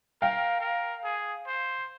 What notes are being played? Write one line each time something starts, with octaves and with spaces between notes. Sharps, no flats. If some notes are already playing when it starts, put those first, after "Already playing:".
A#4 F5 G5
A#4
G#4
C5